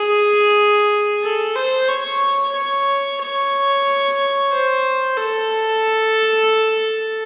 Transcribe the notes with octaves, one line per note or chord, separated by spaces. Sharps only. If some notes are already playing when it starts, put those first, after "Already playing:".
Already playing: G#4
A4
C5
C#5
C#5
C#5
C5
A4